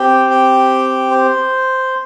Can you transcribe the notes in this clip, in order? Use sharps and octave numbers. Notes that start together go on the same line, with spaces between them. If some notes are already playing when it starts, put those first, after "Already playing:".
Already playing: C4 G4 G5
G5
C5